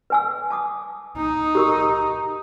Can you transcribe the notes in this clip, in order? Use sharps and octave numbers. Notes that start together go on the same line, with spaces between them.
B4 G#5 E6
A5 D6 D#6
D#4
G4 A#4 C#6